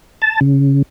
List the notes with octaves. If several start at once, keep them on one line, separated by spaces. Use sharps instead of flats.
A5
C#3